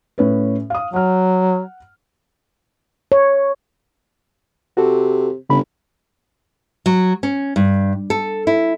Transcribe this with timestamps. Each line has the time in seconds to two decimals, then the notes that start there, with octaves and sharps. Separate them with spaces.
0.18 A2 C#4 B4
0.70 F5 D#6
0.94 F#3 F#5 F6
3.12 C#5
4.77 C3 F#4 A4
5.50 G1 C#3 B5
6.86 F#3
7.23 C#4
7.56 G2
8.10 A4
8.47 E4